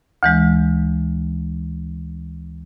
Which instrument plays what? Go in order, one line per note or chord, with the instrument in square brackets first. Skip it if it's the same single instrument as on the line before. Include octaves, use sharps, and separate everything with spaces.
[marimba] D2 E3 G#3